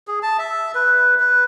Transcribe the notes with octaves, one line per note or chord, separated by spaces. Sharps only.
G#4
A5
E5
B4
B4